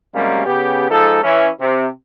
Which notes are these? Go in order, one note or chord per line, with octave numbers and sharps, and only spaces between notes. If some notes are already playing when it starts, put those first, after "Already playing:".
F#2 C3 G3 G#3 A#3 C#4
C#3 B3 G4
G#2 F3 D#4 A4
E3 C#4 E4
C3